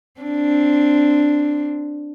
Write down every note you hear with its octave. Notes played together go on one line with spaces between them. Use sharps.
C4 D4